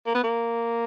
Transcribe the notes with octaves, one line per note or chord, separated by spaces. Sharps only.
A#3
B3
A#3